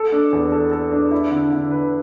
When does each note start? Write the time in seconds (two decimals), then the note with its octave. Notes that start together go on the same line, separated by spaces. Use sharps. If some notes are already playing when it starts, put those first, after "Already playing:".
Already playing: A4
0.12 D4
0.32 E2
0.52 A4
0.72 A4
0.92 D4
1.11 E4
1.31 D3
1.52 D3
1.71 B4